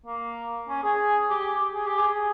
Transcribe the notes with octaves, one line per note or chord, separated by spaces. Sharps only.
A#3
C#4
G#4
G4
G#4
G4
G#4